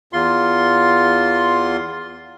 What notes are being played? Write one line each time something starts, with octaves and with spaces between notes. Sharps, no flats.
E2 F4 C6